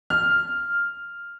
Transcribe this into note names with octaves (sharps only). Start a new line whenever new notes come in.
F6